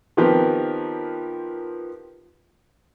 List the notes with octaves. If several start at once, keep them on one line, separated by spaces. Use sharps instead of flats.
D#3 F3 B3 C4 G4 A#4